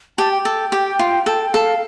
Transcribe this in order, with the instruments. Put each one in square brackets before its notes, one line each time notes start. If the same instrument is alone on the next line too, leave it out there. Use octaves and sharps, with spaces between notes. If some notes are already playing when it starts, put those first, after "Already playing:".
[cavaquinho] G4 [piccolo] A5
[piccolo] G5
[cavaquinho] A4
G4
F4
A4
[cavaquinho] A4 [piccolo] F5